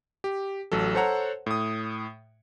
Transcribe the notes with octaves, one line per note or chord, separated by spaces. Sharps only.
G4
A1 F#3 A4
A4 C5 C#5 F#5 A#5
A2 D#6